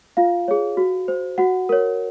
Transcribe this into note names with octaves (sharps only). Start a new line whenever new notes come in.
F4 F5
G#4 C#5
F#4
C5
F#4 F#5
A#4 C#5